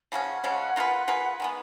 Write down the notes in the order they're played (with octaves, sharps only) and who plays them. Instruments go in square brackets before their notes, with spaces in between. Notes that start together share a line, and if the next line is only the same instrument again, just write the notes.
[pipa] C#3 F3 G#3 C#4 [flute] F#5
[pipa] C#3 F3 G#3 C#4
A#3 F4 G#4 B4
A#3 F4 G#4 B4
[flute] F#5
[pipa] D#3 G#3 B3 [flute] G#5